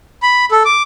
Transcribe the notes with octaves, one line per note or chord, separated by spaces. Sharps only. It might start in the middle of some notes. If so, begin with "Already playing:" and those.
B5
A4
D6